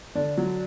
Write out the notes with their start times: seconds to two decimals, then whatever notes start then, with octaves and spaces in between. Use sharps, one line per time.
0.15 D3 D4
0.37 F#3